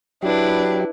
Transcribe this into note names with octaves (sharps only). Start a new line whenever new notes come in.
F#3 D4 E4 G4 B4